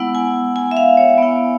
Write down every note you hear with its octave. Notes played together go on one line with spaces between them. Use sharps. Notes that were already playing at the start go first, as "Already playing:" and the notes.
Already playing: G#3 B3 E4 F#5
G#5
G#5
E5
F5
C#5
B3 E4